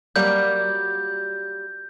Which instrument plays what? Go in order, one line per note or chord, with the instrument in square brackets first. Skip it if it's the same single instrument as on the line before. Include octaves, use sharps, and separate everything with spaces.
[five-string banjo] F#3 G3 A#3 [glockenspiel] G6